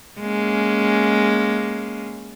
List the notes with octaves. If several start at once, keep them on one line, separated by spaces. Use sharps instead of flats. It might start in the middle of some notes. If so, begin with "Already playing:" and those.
G#3 A#3 C#4